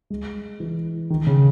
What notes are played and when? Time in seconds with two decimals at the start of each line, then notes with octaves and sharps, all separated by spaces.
0.10 G#3
0.60 E3
1.10 D#3
1.27 C#3